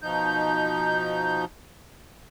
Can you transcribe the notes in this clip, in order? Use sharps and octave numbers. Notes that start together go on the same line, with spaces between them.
B2 F3 D#4 G6